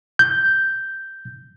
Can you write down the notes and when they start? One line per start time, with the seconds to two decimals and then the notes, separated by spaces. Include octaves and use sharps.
0.19 G6